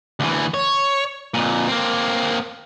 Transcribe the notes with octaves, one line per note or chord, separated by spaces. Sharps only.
D2 E3
C#5
F2 A#2
A#3 C4